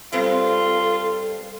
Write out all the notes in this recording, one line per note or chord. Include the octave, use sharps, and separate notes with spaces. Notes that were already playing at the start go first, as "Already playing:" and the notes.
G2 C4 D4 F4 A4